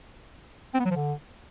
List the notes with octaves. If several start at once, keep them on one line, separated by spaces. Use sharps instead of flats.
C4
B3
F#3
F3
D3